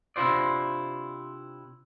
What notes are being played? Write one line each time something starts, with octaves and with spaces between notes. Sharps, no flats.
C3 D4 E4 F4 C5 D5